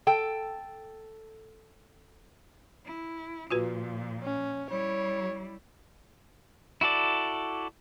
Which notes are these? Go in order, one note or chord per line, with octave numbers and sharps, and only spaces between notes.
A4 G5
E4
A#2 F3 F4 F#4 B4
C#4
G3 E4 C#5
E4 F#4 A4 D5